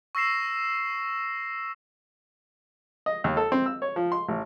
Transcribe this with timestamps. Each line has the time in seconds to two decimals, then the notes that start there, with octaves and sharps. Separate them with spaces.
0.15 C#6 E6 A#6 C7 E7
3.06 D#5
3.24 D#2
3.37 A4
3.52 C4
3.66 E6
3.82 C#5
3.96 F3
4.12 C6
4.28 A1